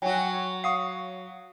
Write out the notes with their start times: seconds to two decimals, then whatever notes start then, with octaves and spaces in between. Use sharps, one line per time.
0.02 F#3 F#4 G5 G#5
0.64 F5 F#5 C#6 D#6 C7